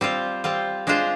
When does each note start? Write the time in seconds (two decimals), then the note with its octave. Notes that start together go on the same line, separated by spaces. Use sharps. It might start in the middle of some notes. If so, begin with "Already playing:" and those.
0.01 G3 C4 F4
0.44 G3 C4 F4
0.87 G#3 D4 F4 C5